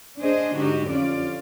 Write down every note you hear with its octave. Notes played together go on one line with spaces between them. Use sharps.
D4 G#4 C5 D#5
G#2 D3 D#4 F#4 G4
F2 C#4 F4 D5